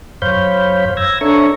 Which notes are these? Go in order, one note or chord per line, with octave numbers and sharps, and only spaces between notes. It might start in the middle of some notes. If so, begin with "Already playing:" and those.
F#2 C5 C#5 F5 B5 G6
E6 G#6 A#6
D4 A4 C#5 E5 A#5 C#6